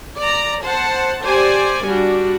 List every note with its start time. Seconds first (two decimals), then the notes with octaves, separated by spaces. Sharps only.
0.18 D5 A#5
0.63 C5 F#5 A5
1.25 G4 C5 D5 G#5
1.85 G3 D4 F#4